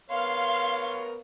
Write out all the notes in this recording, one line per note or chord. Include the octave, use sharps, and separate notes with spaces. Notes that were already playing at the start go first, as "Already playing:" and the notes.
B3 A#4 C#5 F5 C6